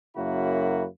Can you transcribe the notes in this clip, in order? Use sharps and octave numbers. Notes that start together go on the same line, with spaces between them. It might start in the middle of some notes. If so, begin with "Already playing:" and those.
F#2 C#3 A#3 E4 F#4 B5